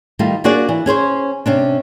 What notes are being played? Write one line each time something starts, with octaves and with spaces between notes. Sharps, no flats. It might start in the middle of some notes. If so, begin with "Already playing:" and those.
D#3 G3 A3 D#4 F4
A#3 D4 F4 F#4 G#4 D5
E3
C#4 G#4 C5 C#5
C3 C#4 D4